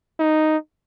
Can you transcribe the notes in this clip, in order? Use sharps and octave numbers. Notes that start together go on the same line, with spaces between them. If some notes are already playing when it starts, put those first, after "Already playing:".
D#4